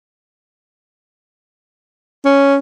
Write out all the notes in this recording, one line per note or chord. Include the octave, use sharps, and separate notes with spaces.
C#4